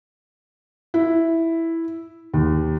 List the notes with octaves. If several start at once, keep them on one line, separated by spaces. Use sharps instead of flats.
E4
D#2